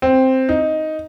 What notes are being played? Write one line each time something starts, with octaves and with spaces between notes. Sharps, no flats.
C4
D#4